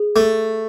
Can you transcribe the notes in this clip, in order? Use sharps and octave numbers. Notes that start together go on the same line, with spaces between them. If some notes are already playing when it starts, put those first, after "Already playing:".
Already playing: G#4
A3